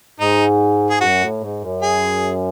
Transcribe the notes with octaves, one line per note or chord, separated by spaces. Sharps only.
G#2 D#4
G#4
F#2 F#4
A2
G#2
F#2
G#4